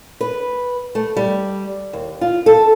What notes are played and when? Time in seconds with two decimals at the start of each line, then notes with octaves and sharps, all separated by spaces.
0.21 B4
0.95 A3
1.17 G3
1.93 D#2
2.21 F4
2.46 A4